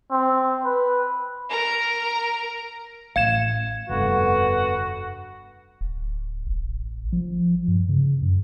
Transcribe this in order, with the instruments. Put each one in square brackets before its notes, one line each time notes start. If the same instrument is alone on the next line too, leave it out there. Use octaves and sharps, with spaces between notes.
[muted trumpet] C4
B4
[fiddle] A#4 A#5
[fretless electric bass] A1 [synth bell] F5 G#6 E7
[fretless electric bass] F1 G2 [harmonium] D3 B3 B4 [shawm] F#4
[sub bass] D1
A1
F3
G2
C#3
F#2